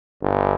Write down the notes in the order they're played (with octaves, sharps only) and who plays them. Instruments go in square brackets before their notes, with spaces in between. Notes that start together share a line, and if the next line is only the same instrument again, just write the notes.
[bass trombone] G1